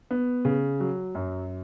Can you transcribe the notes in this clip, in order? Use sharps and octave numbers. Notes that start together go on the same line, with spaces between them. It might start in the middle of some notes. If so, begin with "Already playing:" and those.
B3
C#3
F#3
F#2